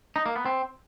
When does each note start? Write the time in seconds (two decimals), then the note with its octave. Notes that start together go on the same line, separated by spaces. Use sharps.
0.16 D#4
0.26 A#3
0.36 B3
0.46 C4